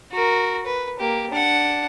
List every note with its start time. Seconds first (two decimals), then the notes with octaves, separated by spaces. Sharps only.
0.12 F#4 A#4
0.66 B4
0.99 A#3 G4
1.31 D4 F#5